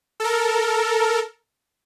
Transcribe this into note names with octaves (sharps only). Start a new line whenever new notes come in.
A4 A#4